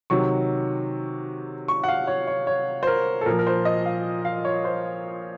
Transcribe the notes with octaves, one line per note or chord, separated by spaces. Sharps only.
C3 D#3 F#3 C#6
C#6
F#5
F5
C#5
C#5
C#5
C5
A#4
A4
A#2 F3 A#4
A#4
C5
D#5
F5
F5
C#5
C5